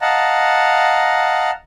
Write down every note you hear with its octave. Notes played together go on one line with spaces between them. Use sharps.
D#5 F5 F#5 A5 A#5